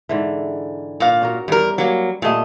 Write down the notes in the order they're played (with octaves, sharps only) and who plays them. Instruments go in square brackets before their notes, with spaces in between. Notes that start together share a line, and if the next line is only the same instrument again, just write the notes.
[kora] G#2 D3 E3
[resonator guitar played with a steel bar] A#2 F5
[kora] C#4 F#4 A#4
[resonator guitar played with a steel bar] E2 A#4 [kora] G3
[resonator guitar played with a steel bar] F#3 A#3
[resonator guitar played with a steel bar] A#2 D#5 [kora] G3 A3 B3